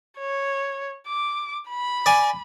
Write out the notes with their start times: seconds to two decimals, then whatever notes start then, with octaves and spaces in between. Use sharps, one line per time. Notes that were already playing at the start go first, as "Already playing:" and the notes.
0.19 C#5
1.07 D6
1.69 B5
2.06 D5 G#5